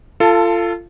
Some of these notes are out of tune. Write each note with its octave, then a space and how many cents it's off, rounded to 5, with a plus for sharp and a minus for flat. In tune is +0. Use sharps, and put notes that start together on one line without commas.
F4 -20 A4 +15 A5 +0